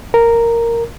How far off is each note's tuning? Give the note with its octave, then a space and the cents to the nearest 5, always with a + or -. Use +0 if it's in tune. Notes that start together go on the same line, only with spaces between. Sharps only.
A#4 -5